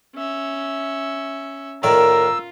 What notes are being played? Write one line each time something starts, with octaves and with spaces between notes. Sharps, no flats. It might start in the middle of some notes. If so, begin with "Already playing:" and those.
C#4 E5
A2 D#3 F4 A#4 D5 E6